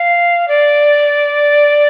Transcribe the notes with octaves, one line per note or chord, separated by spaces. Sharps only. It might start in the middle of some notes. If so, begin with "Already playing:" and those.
Already playing: F5
D5